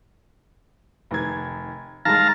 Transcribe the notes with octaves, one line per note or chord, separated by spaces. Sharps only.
F1 D#3 G#6
D#3 G3 G#3 F5 A5 A#5